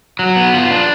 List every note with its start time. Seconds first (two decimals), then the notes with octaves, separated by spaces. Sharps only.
0.19 F#3
0.36 B3
0.54 F4
0.71 D4